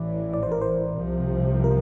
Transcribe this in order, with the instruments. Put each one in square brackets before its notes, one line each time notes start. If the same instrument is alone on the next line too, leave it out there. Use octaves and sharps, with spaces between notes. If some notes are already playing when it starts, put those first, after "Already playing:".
Already playing: [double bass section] A1 A2 E3 [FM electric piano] D5
[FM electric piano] D5
C5
A#4
C5
[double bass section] C2 C3 F3
[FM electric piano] A#4